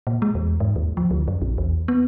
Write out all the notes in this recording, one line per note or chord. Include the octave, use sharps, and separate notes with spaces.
A#2
G#3
E2
G#2
D#2
F3
D2
F#2
A#1
E2
B3